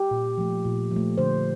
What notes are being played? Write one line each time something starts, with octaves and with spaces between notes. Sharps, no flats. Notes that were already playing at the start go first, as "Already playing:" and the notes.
Already playing: G4
A#2
F3 A3
A#2
F3
A3
D3 C5